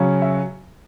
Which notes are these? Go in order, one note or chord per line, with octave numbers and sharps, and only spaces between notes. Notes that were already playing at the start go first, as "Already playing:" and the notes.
Already playing: C#3 F#3 C#4
E5